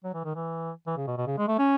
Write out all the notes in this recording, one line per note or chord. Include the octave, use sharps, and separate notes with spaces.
F#3
E3
D#3
E3
E3
C#3
B2
B2
C#3
G#3
A3
C#4